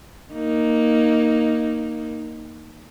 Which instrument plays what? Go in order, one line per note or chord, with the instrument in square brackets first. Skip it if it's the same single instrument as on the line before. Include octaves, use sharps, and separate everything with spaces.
[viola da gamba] A#3 D#4